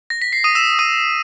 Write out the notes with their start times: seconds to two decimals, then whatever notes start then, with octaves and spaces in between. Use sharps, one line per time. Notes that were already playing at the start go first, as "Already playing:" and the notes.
0.10 A#6
0.22 B6
0.33 C7
0.44 D#6 D#7
0.55 E6 E7
0.79 D#6 D#7